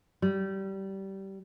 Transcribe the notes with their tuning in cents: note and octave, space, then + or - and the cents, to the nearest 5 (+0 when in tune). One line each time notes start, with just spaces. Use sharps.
G3 -20